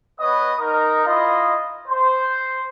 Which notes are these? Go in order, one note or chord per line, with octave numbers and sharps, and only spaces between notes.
B3 B4 C#5 D#5 D#6
D#4 A#4
E4 F4 D#5
C5